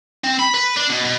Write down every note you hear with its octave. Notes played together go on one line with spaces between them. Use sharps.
C4
B5
B4
D4
B2
B2